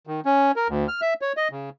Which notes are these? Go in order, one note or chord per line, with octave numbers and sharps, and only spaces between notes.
D#3
C#4
A#4
D2
F6
E5
C#5
D#5
C#3